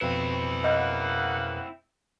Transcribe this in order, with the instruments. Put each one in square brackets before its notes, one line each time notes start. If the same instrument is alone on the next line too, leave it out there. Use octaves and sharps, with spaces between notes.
[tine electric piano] F2 B2 B4 [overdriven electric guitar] C4 E4
[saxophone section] C#3 A#3 F#5 [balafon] D#5